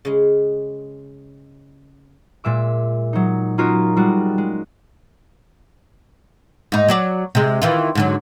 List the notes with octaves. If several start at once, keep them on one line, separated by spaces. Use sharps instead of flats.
C#3 G#3
A#2 G#3 E5 D6
F#3 D#4
A#3 C#4 D#4 F4 F#4 A#4
G3 G#3 F4 F#4
G#3
G#2 D#4
F#3 F#4 D5
C3 G#3
D#3 E3 F4
G#2 D3 F#3